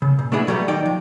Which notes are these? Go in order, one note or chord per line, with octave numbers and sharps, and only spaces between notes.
C#3
A#2
A3 B3 D4 E4 G#4
B2 F#3 G3 A3 B3
B1 D#3 D#4 D5 G5
F3